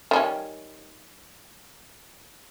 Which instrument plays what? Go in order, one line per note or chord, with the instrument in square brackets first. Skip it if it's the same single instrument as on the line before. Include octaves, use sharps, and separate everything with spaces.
[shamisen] D#3 G3 C#4